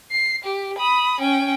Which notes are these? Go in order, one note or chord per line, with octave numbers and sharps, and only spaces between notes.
C7
G4
B5 D#6
C#4 G5